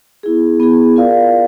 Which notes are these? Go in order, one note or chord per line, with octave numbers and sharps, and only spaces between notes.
B3 E4 G#4
B3 E4 G#4
F4 A#4 D5 F5